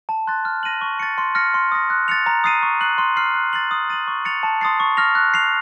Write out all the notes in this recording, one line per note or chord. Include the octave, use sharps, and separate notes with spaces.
A5
C6 F#6 A6
F6
A#6 D#7 F#7
C#6
A6 C#7
C6
F6 A#6 C#7
C6
D#6 A#6
F#6
A6 C#7 F7
A#5
D#6 A6 C7 D#7
C#6
F#6 C7 F#7
C6
F6 C7 F#7
F#6
A6 C7 F#7
D#6
A6 D#7 F#7
C#6
A6 C#7 F7
A5
C6 D#6 A6 C7
C#6
F6 A#6 F7
F#6
C7 F7